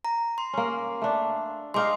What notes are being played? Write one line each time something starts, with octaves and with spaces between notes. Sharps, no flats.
A#5
C6
A#3 C#4
A3 D4
G#3 D#4 F5 C6 D6